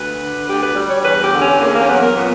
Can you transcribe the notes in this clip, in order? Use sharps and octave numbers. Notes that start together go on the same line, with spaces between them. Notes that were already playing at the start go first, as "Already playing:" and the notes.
Already playing: D2 B4
D3
D2 G4
B4
G3
C#5
E2 B4
G4
D3
C#4
E2 A#3
A#3
C#4
F#3 B3
A#4
A#2 B3